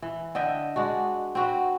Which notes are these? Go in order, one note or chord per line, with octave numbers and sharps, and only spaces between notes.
E3
D3 D#5 E5 G5
G#3 D4 F#4
C4 F#4 B4